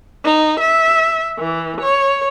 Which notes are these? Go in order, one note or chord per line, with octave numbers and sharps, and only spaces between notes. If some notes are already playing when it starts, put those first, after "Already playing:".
D#4
E5
E3
C#5